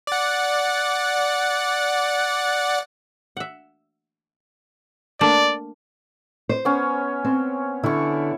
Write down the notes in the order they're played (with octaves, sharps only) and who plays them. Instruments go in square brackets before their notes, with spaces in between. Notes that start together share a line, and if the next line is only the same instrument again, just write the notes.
[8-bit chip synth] D5 F#5
[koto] E5 F#5
[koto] A3 A#3 D4 [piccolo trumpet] D5
[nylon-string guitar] C5
[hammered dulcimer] B3 C#4
[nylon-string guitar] C4
[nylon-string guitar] D3 [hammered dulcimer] E4 C#6